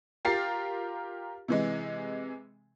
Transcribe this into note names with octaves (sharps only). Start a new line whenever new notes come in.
F4 G4 A#4 A6 C7
C3 E3 G#3